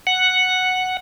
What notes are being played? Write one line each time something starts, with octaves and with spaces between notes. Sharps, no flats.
F#5